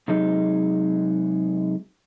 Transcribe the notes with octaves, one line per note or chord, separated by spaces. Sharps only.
C3 F#3 G#3 D#4